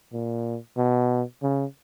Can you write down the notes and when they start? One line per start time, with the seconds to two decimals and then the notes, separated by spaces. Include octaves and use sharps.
0.13 A#2
0.77 B2
1.43 C#3